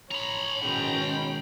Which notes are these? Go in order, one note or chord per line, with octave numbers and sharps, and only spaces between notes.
C#5 A#5 B5
G#2 B2 D#3 C#4 G5